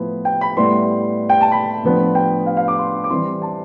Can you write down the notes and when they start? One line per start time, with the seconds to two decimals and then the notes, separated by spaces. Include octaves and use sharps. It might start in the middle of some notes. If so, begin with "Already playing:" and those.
Already playing: A2 F3 B3 E4
0.25 G5
0.41 B5
0.57 A2 G3 B3 E4 C6
1.30 G5
1.41 A5
1.52 B5
1.83 A2 F3 B3 D4
2.15 G5
2.46 F5
2.57 F5
2.68 D6
2.78 C6
3.04 D6
3.10 E3 G3 C4 E4 C6
3.42 A5